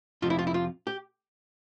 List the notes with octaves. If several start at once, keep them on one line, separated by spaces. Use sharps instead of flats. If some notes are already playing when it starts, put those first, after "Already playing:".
F2 C3 F3 F4
E4
F4
E4
F4
G4